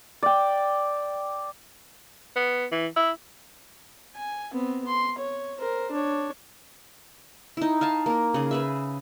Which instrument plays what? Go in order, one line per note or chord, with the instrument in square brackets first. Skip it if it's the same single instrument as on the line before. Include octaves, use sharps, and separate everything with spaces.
[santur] D5 G5
[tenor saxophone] B3
E3
E4
[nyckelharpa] G#5
B3 C4
C6
C#5
A#4 C5
D4 C#5
[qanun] D#4 E4
F5 G#5 A5
A#3 A#4
C#3 G#4
G#4 B4 E5